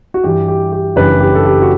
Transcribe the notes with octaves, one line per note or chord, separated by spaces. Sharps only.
F#4
G2 E3 G3 G4
G4
G4
F#1 F#2 E3 G3 D4 G4 B4
G4
A4
G4
F#4